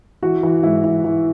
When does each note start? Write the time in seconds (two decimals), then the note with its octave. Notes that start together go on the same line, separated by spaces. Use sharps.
0.23 E3 F#4
0.43 E3
0.63 G#2 E4
0.84 E3
1.04 E3